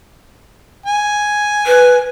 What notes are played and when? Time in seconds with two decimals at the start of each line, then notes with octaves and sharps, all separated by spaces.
0.86 G#5
1.67 B4